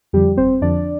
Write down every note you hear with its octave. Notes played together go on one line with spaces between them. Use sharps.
F2 D3 F3 G3 G4
G1 C4 C5
F2 D3 F3 D4 D5